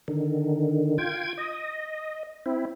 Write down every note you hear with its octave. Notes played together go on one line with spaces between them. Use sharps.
D3 D#3
F4 G5 G#6
D#5
C4 E4